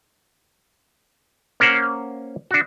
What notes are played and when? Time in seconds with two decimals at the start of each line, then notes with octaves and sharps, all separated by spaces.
1.60 A#3 C#4 A#4 C5 F#5
2.51 D4 F#4